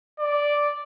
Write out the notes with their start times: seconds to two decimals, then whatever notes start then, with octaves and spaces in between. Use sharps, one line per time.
0.19 D5